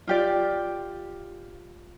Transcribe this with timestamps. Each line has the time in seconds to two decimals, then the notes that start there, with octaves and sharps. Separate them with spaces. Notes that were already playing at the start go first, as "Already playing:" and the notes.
0.07 F4 G4 D5